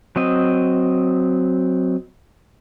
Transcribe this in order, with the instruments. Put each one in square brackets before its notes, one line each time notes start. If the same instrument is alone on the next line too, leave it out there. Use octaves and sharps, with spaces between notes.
[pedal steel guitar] F#3 C4 D#5